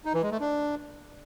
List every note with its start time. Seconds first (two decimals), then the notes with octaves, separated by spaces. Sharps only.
0.05 D#4
0.14 E3
0.23 G#3
0.31 A3
0.40 D4